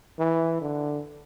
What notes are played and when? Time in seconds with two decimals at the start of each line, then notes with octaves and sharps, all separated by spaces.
0.19 E3
0.61 D3